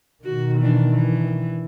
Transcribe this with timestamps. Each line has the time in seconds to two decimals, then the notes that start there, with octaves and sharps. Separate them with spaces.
0.24 B2 D#3 F#4
0.58 E3 D4
0.91 E3